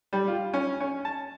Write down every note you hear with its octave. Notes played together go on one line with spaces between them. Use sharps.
G3
F4
C#4
C#4
A5